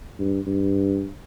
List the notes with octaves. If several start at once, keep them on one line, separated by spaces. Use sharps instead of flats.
G2
G2